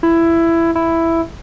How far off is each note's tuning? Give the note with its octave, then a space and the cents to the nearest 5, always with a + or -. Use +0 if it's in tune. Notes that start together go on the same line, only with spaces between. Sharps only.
E4 +15
E4 +5